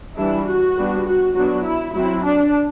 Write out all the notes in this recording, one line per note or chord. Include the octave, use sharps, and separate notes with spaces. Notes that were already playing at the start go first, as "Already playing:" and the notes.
E3 G3 D4 E4
F#4
G3 B3 D4
F#4
F#3 B3 D4 F#4
E4
F#3 C4 E4
D4